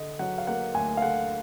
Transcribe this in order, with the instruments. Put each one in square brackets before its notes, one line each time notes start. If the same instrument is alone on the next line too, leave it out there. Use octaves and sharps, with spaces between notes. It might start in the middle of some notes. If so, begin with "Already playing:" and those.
Already playing: [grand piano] D3 D#5
F#3 F#5
F5
A#3 F#5
D2 G#5
F5
D3 F#5